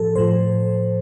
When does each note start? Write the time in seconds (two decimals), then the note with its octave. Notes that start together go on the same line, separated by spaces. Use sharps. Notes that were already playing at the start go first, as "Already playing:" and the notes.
Already playing: A2 F3 A4
0.15 A2 F3 C5